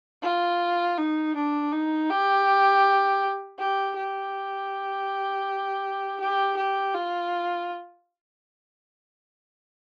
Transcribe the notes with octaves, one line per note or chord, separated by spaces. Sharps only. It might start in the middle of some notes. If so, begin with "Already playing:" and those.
F4
D#4
D4
D#4
G4
G4
G4
G4
G4
F4